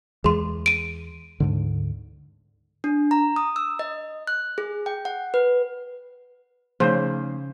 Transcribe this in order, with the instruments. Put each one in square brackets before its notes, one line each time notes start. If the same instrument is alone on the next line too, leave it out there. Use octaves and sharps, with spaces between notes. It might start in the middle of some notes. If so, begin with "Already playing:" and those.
[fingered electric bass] E2 E3 G#3 [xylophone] G#4 C6
[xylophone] D7 D#7
[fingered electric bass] D2 G#2 D3
[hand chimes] D4
A#5
D#6
E6
D#5
F#6
G#4
G5
F#5
B4
[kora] C#3 [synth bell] F3 A3 D#4 [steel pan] C5